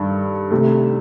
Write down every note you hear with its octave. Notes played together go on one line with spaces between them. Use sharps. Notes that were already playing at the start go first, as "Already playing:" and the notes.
Already playing: G2 D#3 A4
C3 D#3 A3